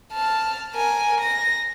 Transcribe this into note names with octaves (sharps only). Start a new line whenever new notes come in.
A5 F6
A#4 G#5
A#6